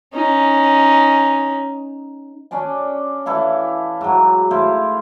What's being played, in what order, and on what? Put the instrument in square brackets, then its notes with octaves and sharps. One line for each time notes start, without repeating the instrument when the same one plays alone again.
[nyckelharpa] C#4 D#4
[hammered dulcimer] C#4 D4 D5 G#5
E3 E4 A4 F5
G#2 F#3
A3 E4 C5 F5